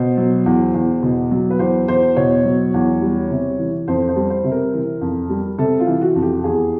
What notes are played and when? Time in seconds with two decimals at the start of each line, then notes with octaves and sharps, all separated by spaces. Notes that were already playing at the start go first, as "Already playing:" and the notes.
Already playing: B2 C5
0.17 F#3
0.46 E2
0.74 E2
1.03 B2
1.31 F#3
1.50 B4
1.59 E2 C5
1.88 E2 C5
2.16 B2 C#5
2.45 F#3
2.74 E2
3.02 G3
3.31 C3
3.59 E3
3.88 F2 C5
4.09 C5
4.16 G3
4.30 C5
4.44 C3
4.52 A#4
4.73 E3
5.01 F2
5.30 G3
5.58 C3 A4
5.80 F4
5.87 E3
6.01 F#4
6.16 F2
6.22 G4
6.44 E2 G#4